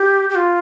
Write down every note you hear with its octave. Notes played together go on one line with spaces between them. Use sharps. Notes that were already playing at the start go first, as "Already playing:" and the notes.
Already playing: G4
G4
F4